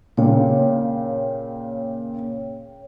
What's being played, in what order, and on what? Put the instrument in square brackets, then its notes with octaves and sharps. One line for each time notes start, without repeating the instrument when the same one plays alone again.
[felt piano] A#2 C#3 [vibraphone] C#5 G5